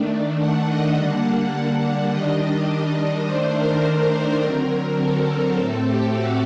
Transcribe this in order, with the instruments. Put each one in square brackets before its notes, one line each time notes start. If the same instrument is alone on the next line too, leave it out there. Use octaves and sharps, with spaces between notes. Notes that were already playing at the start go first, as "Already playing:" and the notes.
Already playing: [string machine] D#3 A3 D4
F#5
D#5
D3 G3 A#3 D4 F#5
D#3 G3 D4 D#5
D#3 A3 D4 C5
A#4
A#4
D3 F#3 C4
A4
A#4
A2 A3 C4 A4
G4
F#4